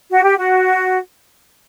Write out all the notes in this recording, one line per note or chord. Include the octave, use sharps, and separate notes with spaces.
F#4
G4
F#4